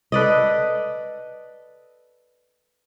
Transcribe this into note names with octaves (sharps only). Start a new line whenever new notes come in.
A4 B4 D5 D#5